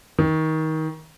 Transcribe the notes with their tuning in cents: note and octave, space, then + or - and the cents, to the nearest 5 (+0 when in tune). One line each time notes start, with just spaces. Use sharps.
D#3 +25